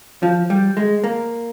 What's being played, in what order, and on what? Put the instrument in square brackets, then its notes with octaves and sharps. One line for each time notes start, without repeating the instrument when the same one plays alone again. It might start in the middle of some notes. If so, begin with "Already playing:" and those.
[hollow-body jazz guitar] F3
G3
G#3
A#3